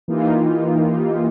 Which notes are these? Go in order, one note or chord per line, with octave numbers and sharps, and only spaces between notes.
E3 A#3 D#4 F4 G4